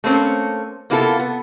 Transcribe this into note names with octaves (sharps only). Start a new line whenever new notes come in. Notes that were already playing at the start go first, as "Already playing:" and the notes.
A3 A#3 C4 C#4
C3 A#3 B3 E4 F4 A4
B3